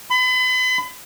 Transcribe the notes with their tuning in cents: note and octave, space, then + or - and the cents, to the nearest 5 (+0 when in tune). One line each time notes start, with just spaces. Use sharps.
B5 +40